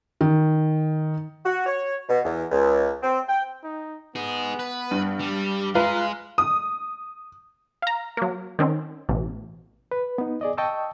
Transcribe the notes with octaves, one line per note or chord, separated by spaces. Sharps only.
D#3
F#4
C#5
B2
E2
C#2
C4
G5
D#4
B3 D#4 G#4
B4
G2
G3
G#3 F4 B4 F5 A#5
D#6
F5 A#5
F#3 A#3
D#3 C4 C#4
A1 B2
B4
B3 D#4
G#4 D5 D#5
D#5 G5 A5 C#6 D#6 E6